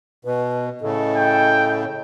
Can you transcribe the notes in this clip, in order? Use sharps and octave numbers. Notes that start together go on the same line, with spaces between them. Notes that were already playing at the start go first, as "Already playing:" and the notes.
B2 B4
A2 C#3 A4 D#5
G5